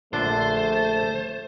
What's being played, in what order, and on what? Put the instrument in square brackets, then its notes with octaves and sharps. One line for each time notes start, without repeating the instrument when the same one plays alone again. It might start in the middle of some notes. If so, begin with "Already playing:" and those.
[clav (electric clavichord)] A#1 D3 D4 [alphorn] A3 [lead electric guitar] C5 [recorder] A6